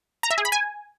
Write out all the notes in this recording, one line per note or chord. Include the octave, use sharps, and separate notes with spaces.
A#5
E5
G#4
B5
G#5